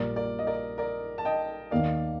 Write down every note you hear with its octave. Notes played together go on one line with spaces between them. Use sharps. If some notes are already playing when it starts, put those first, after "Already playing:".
Already playing: A#1 A#2 G3 A#3 A#4 D5
A#4 D5
D#5
A#4 D5
A#4 D5
A5
D#5 G5
D#2 D#3 A#3 D5 F5